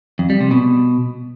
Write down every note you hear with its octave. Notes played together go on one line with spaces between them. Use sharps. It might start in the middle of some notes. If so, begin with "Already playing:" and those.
F2
G3
C3
B2